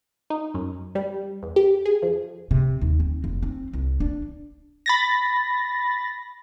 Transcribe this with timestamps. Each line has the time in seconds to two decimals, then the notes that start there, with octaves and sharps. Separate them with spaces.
0.30 D#4
0.54 F#2
0.95 G3
1.43 E2
1.56 G4
1.86 G#4
2.02 F2
2.51 C3
2.81 D#2
3.00 C4
3.24 F1
3.43 C4
3.73 C2
4.00 D4
4.86 B5 A6 A#6